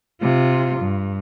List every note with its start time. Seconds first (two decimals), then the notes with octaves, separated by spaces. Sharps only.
0.22 C3 F4
0.80 G2